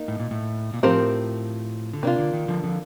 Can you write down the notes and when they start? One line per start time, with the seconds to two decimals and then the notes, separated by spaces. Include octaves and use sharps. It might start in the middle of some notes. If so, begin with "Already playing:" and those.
Already playing: A#3 D#4 A#4
0.08 A2
0.20 A#2
0.31 A2
0.74 A#2
0.83 A2 F3 C4 G4 A#4
1.93 D3
2.03 C3 A#3 D4 F4
2.19 D3
2.33 D#3
2.48 D3 F3
2.64 D3 F3